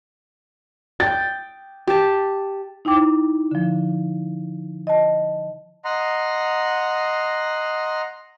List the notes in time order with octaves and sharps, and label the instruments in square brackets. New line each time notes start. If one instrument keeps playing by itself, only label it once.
[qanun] G5 [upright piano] A6
[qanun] G4 A5
[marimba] D#4 E4 G5 D6
D3 F3
D#5 A5
[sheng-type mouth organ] D#5 F#5 A#5 C6